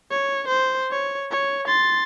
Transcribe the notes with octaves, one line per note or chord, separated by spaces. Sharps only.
C#5
C5
C#5
C#5
C6 A6